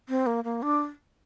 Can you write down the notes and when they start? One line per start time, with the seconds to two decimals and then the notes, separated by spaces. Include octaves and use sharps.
0.09 C4
0.27 A#3
0.44 A#3
0.62 D4